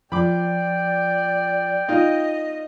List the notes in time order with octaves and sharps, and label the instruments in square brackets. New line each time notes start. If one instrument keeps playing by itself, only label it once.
[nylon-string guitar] F3 [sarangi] D5 [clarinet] G5 [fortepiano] B5 D6
[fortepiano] D#4 F4 [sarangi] D#5